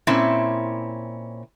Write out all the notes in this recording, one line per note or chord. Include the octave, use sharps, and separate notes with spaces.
A#2 C4 C#4 E4